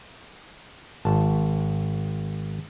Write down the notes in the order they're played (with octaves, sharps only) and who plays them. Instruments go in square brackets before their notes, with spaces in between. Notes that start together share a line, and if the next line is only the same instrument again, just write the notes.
[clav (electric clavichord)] G#1 A5